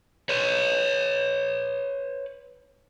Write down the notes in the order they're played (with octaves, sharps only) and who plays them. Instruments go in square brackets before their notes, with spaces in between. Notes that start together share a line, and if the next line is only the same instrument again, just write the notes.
[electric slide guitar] B4 C#5